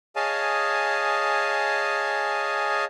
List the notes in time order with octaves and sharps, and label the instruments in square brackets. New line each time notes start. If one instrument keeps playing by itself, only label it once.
[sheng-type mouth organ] G#4 C#5 D#5 F5 G#5 A5